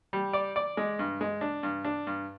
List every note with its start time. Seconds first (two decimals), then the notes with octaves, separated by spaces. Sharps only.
0.13 G3
0.33 D5
0.56 D5
0.77 G#3
0.99 G2
1.21 G#3
1.41 D4
1.63 G2
1.85 D4
2.07 G2